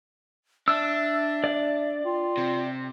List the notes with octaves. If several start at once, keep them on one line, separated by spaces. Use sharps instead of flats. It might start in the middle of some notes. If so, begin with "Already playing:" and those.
D4 E5 E6
D5
F4 G5
C3